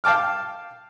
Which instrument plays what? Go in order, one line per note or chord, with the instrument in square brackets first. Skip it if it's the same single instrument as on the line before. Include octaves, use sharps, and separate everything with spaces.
[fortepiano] F5 G5 A5 D6 F6